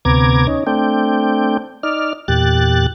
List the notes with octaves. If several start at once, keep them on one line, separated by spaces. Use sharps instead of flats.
D2 C3 B3 A#5 D6 G#6
C#4 D#4
A3 C4 D4 G5
D#4 D5 F6
E2 A#2 G4 F#6 A6